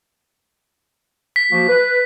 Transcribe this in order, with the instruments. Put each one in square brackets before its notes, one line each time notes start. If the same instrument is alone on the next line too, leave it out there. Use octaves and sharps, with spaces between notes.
[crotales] B6
[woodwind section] F3 A#3 F#4
B4